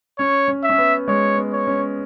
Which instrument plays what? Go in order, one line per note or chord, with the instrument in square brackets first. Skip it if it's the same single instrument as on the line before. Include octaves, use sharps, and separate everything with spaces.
[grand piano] C#4 [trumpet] C#5
[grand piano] C#4
[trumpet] E5
[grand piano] C#4
B3
[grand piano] G#3 [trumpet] C#5
[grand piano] B3
[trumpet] C#5
[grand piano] C#4